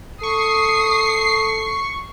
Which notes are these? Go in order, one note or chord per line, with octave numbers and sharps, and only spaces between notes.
A4 C#6 D#6 C7